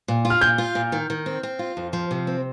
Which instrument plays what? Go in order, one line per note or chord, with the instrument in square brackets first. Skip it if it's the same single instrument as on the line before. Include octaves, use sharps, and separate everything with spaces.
[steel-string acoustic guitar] A#2
F4
[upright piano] F6
[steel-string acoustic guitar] A#2 [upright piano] G6
[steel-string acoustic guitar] F4
A#2
D#3
D#3
C4
C4
F4
F2
F3
C3
C4